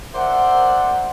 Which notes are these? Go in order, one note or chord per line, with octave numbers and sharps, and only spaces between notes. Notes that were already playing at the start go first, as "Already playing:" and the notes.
A#4 C5 D5 E5 F#5